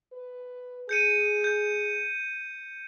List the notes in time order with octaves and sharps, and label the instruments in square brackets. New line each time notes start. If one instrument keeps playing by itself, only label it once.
[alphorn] B4
[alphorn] G#4 [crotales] G6 C#7 D#7
[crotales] G6